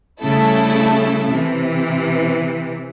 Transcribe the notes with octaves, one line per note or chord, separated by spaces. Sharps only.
C#3 G3 A3 E4 A4
C3 E3